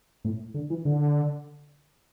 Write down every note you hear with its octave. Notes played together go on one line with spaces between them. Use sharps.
A2
D3
E3
D3